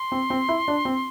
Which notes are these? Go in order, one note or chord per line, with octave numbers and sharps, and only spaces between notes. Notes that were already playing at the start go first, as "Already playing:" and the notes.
Already playing: C6
C4
C4
E4
D4
C4